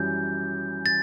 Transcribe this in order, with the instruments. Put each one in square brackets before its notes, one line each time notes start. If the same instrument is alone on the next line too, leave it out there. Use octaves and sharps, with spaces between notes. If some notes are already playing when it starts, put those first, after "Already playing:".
Already playing: [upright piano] F#2 E3 G3 C#4 F#4 [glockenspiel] G6
[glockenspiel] A6